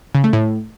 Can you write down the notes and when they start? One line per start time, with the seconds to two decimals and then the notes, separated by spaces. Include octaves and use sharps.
0.15 C#3
0.24 A3
0.33 A2